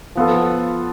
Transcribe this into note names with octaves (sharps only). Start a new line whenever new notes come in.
F3 B3 F4 A4